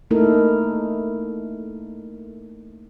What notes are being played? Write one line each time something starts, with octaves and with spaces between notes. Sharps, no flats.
A3 A#3 D#4 E4 A4 A#4